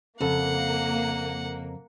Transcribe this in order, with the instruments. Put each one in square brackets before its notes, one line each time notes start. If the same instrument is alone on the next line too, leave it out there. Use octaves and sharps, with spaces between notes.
[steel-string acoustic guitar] F2 [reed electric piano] C#3 A4 [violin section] A#3 [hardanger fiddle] F#5